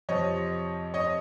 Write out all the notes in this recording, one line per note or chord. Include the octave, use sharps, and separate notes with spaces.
F2 C3 F3 C#5 D#5
C#5 D#5